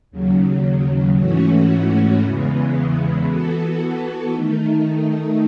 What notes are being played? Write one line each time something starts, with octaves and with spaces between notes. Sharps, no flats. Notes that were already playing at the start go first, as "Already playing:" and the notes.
D#2 C#3 F#3
G#2 E3 A3 C#4 F#4
E2 C#3 E3 G#3 B3
E3 B3 F#4 A4
D#3 A3 D#4